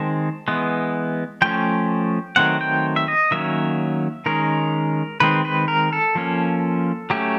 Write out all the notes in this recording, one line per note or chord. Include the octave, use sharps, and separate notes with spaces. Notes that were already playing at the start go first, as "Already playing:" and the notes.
Already playing: D#3 G#3 C4 A5
E3 G#3 B3
F3 A3 C#4 G5
D#3 F#3 A3 C4 F#5
G5
E5
D#5
D#3 F#3 A#3 C#4 E5
D#3 G#3 C#4 A#4
D#3 G#3 C4 B4
B4
A#4
A4
F3 A#3 C#4
F#3 A3 C#4 G4